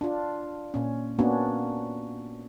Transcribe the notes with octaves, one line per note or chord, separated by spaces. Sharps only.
D4 F4
A#2 C#4
A#3 B3 C#4 D4 F#4